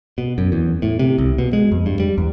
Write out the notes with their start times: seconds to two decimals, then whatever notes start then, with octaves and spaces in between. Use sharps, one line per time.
0.18 B2
0.38 F#2
0.52 E2
0.82 A2
0.99 C3
1.18 C2
1.38 B2
1.53 G#3
1.72 F2
1.86 G2
2.00 G3
2.18 E2